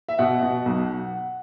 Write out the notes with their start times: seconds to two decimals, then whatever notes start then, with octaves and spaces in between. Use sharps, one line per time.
0.08 E5
0.19 B2 F#5
0.42 B2
0.66 B1